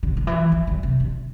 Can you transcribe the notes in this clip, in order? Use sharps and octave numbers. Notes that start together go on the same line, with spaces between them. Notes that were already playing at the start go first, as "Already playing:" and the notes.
D3
D3
E3
F3
D3
C3
D3